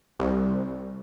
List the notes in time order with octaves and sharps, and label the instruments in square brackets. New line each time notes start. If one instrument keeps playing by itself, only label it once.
[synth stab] C2